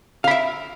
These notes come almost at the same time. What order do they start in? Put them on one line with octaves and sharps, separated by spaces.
F5 B5 E5